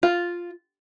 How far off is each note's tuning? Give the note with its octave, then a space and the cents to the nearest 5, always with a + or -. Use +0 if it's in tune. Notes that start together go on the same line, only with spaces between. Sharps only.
F4 +0